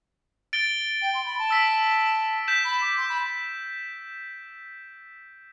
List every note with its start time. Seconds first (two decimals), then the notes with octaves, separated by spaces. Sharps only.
0.53 A6 D7 G7
1.02 G5
1.14 C6
1.26 B5
1.39 A5
1.51 E6 B6 D7
2.48 G6 B6 E7
2.65 B5
2.81 D6
2.97 C6
3.09 B5